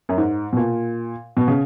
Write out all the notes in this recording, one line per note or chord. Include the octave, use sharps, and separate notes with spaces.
F#2
G#2
B2
A#2
B2
C#3